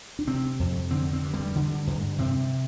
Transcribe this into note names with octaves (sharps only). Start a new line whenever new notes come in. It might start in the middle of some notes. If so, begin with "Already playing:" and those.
D4
C3 C4
F2
D3 C4
C4
G2
G3
D3
G2
C3 C4